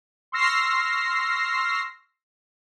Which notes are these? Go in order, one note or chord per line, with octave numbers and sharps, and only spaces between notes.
C6 C#6 E6 F6 A#6 C7